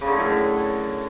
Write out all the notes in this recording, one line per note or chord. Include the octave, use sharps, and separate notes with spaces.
C#3
D3
A2
F#2
A2